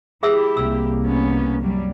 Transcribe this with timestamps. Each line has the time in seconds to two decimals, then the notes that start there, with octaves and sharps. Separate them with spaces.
0.23 E4 G4 G#4 E5 E6
0.57 C2 A#3 E6
1.05 B3 C#4
1.60 F#2 F#3 G3